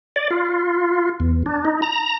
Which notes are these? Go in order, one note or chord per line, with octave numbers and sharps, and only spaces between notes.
D5
F4
E2
D4
D#4
A#5